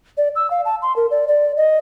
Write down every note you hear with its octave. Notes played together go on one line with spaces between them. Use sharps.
D5
E6
F5
A5
C6
A#4
D5
D5
D#5